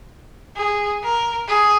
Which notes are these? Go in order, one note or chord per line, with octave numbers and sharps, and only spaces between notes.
G#4
A#4
G#4